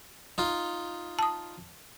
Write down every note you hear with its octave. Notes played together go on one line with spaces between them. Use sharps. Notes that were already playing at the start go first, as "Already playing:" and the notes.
D#4 F4
A5 D#6